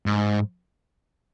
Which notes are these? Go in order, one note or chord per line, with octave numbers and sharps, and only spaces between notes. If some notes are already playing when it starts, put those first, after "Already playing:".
G#2